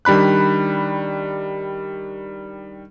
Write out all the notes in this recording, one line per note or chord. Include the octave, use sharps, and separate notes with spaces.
D#3 G3 D4 B5 F#6